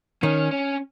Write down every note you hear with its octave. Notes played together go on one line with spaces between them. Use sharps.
D#3 C#4
C#4